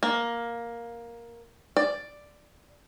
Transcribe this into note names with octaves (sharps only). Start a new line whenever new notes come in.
A#3
D5